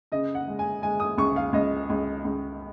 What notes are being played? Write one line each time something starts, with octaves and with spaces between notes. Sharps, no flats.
C#3 D#5
F#5
G#3
G#5
G#3 G#5
D#6
C#2 C#6
F5
C#2 D#5
C#2
C#2